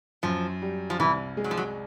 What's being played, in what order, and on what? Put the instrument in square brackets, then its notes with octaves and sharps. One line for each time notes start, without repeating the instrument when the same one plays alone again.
[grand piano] F#2 [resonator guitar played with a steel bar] F3
[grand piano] G3
[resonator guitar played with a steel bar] F3
[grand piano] C2 [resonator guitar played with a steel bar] E3
[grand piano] G#3
[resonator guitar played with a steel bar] F#3
F3
F#3